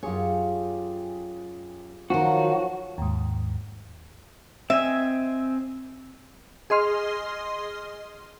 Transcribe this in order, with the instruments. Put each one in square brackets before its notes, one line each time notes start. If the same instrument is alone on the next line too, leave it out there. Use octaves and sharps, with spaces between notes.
[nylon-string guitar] F#2 C#5 [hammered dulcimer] F4 G4 G#4
[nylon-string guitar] D#3 F4 [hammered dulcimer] F3 F#3 [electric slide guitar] F#4
[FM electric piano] D#2 G#2
[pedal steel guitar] C4 D#5 G#5 [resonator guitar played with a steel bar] E5
[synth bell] G#4 D#5 C6 F6